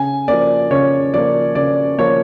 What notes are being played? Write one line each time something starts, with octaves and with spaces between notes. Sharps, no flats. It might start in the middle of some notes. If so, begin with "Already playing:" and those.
Already playing: C#3 G#5
F3 A#3 D5
C#3 C#5
F3 A#3 D5
C#3 D5
F3 A#3 C#5